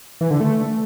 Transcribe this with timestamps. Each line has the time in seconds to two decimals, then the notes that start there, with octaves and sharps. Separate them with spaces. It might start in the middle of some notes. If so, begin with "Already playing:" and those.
0.21 E3
0.31 D3
0.40 A3